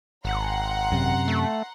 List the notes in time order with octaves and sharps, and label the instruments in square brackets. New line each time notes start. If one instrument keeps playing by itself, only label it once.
[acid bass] G#1 [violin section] F#5 A#5 C6
[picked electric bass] F#2 C3
[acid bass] A3